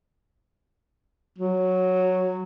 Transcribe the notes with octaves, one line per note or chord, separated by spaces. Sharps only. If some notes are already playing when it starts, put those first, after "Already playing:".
F#3